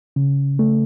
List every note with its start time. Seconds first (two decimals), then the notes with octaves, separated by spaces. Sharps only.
0.16 C#3
0.59 A3